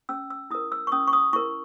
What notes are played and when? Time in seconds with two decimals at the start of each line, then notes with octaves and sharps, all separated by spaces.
0.09 C#4 E6
0.30 E6
0.51 E4 A#4 D#6
0.72 E6
0.87 C#6
0.92 C#4 D#6
1.07 C#6
1.13 D#6
1.33 E4 A#4 C#6